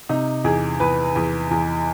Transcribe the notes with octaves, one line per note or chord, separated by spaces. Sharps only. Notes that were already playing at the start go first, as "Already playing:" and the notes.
C3 D#4
E2 G#4
E2 B4
E2
E2